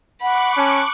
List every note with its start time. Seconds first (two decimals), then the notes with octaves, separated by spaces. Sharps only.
0.22 F#5 B5 C#6 D6 F#6
0.57 C#4 A5